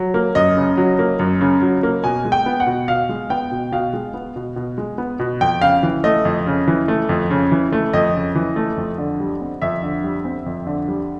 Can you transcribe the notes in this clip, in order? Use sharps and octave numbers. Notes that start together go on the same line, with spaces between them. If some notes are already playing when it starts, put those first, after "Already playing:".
Already playing: F#3
A#3
F#2 D#5
C#3
F#3
A#3
F#2
C#3
F#3
A#3
B2 G#5
G#3
G5
B3
F#5
B2
B2 F5
G#3
B3 G5
B2
B2 F5
G#3
B3
B2
B2
G#3
B3
B2
F2 G5
C#3 F5
E3
A3 D#5
F2
C#3
E3
A3
F2
C#3
E3
A3
F2 D#5
C#3
E3
A3
F2
D3
G3
C4
F2 E5
D3
G3
C4
F2
D3
G3